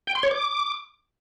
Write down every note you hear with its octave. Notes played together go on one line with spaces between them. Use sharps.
G5
C6
C#5
D6